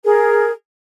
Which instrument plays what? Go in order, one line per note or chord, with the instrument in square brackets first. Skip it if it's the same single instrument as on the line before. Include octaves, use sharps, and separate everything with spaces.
[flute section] G#4 A#4